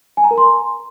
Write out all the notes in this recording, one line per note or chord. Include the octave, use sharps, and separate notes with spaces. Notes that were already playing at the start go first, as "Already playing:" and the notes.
G#5
A#5
A#4
C6